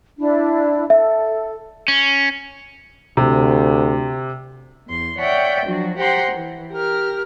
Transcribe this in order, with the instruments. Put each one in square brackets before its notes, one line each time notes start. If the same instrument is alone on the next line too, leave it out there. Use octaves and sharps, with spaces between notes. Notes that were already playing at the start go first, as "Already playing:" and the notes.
[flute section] D4 E4
[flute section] A4 [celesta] E5
[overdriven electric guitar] C#4
[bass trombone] D2 [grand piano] C3
[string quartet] E2 C6
C#5 D5 E5 F#5 G5
F3 F#3 D4 F#4
G4 C5 F#5 G5 A#5 C6
E3
G4 A#4 F6